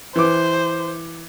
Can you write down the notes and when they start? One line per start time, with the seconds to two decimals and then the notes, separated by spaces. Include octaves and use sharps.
0.16 E3 C5 D6